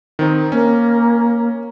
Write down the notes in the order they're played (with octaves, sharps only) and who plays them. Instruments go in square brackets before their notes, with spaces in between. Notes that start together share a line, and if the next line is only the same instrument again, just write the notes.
[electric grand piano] D#3 C4 D#4
[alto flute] A#3 [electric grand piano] C#4